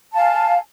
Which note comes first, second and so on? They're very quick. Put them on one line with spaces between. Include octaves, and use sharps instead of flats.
A5 F5 G#5